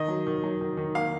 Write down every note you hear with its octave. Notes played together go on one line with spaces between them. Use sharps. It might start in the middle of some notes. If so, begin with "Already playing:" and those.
Already playing: D#3 D#5
F#3
D#3
F#3
D#3
D#3
A#3 F5